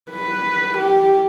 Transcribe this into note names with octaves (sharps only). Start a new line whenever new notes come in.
B4
G4